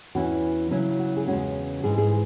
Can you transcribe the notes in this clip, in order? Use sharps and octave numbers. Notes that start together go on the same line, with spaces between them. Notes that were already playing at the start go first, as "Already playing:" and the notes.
E2 E3 C#4 E4 F#4
C#3 F#3 C#4 E4
F#4
G#4
E2 C#3 G#3 C#4 F#4
G#2 E3 G#3 G#4
G#4